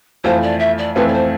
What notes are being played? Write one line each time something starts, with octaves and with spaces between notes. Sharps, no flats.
F2 E3 A3 C4 F4 C5
D5
E5
D5
F2 E3 A3 C4 F4 B4
D5
C5